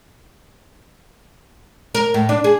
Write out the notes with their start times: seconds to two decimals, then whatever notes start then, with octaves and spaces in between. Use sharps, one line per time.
1.95 A#4
2.14 A2
2.29 D4
2.44 G#4